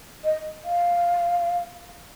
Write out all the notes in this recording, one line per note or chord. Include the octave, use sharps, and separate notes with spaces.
D#5
F5